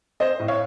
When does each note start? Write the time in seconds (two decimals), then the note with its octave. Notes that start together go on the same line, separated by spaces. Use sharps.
0.20 C4 C5 D#5
0.39 A2
0.48 C#5 F5